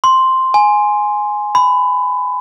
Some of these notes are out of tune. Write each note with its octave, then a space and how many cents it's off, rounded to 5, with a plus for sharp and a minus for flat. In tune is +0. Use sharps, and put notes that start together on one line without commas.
C6 +0
G#5 +5
B5 +20